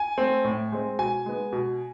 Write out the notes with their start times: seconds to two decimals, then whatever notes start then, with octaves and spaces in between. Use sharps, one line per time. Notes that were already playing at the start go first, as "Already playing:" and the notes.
Already playing: G#5
0.18 A3 C4
0.44 A2
0.72 G#3 C4
0.99 B2 G#5
1.26 G#3 B3
1.53 B2